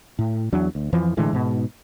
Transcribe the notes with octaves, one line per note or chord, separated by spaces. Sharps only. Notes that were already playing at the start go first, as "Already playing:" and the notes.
A2
E2 F#3 D4
D2
F2 E3 F3
A2 D3 E3 G#3
G#2 B2